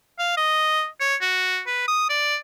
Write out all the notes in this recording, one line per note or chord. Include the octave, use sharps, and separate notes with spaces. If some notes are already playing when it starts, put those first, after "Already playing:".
F5
D#5
C#5
F#4
B4
D#6
D5